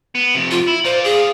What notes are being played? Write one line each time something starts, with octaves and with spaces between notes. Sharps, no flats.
B3
F2 C3
F4
E4
F4 C5 D5
G#4